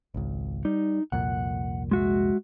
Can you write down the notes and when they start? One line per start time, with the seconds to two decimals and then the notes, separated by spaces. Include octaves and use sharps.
0.14 G#1 C#2
0.65 G3 D#4
1.12 C2 F2 A#2 F#5
1.91 G#3 F#4 E5